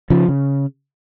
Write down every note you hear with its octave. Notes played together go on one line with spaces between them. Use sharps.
C#3 F3
C#3